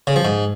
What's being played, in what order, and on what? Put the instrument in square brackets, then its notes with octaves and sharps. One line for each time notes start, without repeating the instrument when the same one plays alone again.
[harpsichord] C#3
F3
G#2